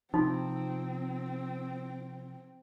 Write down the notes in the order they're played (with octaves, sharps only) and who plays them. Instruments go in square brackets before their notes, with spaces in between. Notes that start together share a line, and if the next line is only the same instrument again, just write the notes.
[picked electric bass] C3 F3 [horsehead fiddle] C4 [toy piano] D#4 F4